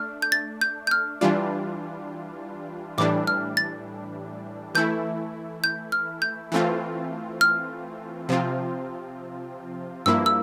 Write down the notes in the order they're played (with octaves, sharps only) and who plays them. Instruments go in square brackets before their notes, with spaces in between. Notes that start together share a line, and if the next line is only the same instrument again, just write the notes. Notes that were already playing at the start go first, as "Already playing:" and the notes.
Already playing: [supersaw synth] A3 D4 [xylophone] F6
[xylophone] G6
A6
G6
G6
F6
[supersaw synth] E3 G3 D4 F4
[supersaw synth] A2 E3 G3 D4 [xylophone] D6
[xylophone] F6
A6
[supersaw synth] E3 A3 E4 [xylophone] G6
[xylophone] G6
F6
G6
[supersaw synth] E3 A3 C4 F4
[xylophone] F6
[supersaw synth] C3 F3 C4 F4
[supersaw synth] G2 F3 A#3 E4 [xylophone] E6
[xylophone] E6